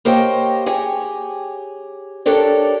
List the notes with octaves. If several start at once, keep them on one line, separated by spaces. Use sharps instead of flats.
A#3 G4 C5 C#5 D#5 G5
G4 G#4 C#5
D4 G4 A4 A#4 C#5 D5